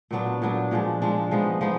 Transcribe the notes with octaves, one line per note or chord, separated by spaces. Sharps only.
A#2 F#3 B3 D4
A#2 F#3 B3 D4
A#2 F3 G#3 D4
A#2 F3 G#3 D4
F3 G#3 B3 D#4
F3 G#3 B3 D#4